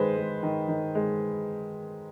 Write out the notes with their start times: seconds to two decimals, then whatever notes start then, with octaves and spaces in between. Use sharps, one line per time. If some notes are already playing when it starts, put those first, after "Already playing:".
Already playing: D#3 G#3 B4 C5
0.17 G#3
0.43 D#3
0.68 D#3
0.95 G#3